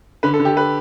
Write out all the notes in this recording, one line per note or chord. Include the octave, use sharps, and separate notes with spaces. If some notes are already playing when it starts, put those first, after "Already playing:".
D3 B4
A4
D3
G4
B4